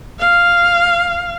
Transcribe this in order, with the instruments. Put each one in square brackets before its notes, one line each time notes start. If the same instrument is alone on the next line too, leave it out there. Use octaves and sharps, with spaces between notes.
[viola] F5